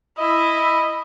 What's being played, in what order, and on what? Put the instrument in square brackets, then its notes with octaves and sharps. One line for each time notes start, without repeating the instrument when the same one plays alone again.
[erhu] E4 [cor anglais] D#5